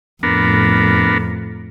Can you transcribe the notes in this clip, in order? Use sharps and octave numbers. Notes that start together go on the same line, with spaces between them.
F2 A2 B3 D4 A#4